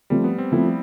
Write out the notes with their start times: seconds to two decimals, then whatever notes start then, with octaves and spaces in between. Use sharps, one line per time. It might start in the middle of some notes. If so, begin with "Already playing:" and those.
0.10 F3 G3 A3 C4
0.24 B3
0.38 C4
0.52 F3 A3 C4 E4
0.67 E4